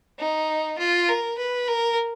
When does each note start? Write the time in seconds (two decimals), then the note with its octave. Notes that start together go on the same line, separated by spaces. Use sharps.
0.19 D#4
0.79 F4
1.09 A#4
1.38 B4
1.68 A#4